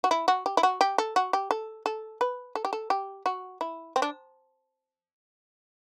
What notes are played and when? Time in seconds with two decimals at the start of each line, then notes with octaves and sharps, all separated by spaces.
0.04 F#4
0.11 E4
0.28 F#4
0.46 G4
0.57 E4
0.63 F#4
0.81 G4
0.98 A4
1.16 F#4
1.33 G4
1.51 A4
1.86 A4
2.21 B4
2.55 A4
2.65 G4
2.73 A4
2.90 G4
3.26 F#4
3.61 E4
3.96 C4
4.02 D4